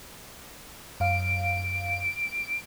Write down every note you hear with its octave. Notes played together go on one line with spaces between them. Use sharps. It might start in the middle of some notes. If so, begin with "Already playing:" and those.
F#2 F5 D7